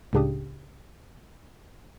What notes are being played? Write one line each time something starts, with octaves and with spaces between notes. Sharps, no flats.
C#2 A2 C#3 D4 G4 D#6